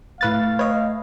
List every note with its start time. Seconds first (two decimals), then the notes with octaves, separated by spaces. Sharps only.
0.21 A2 A3 B4 F5 A6
0.59 B4 C#5 D#5